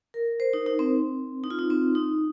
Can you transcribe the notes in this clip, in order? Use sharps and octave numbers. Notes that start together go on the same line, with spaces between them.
A#4
C5
D#4
D#4
C4
D#4
F4
D#4
C4
D#4